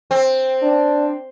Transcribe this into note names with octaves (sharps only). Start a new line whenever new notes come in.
C4
D4